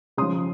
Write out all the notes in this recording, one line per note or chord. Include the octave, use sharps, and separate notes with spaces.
C#3 F3 C6 D#6